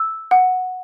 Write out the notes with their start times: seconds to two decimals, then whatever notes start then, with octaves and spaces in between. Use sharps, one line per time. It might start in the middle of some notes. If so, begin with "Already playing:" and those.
Already playing: E6
0.31 F#5